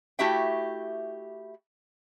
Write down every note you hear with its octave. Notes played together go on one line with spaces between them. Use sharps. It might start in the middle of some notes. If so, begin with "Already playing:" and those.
A3 E4 F#4 G4 E5 G5